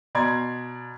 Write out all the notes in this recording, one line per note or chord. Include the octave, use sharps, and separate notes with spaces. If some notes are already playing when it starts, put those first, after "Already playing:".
B2 D5 A#5 C6 G#6